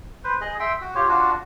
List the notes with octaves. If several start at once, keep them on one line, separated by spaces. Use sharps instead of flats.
B4 C5
G#4 D#5
E5 G5 C6
F#4
F4 G4 C#5
D4 F4 F#4